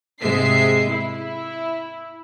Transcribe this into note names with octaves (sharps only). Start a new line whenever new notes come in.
G#2 C3 G#3 E5 C7
E4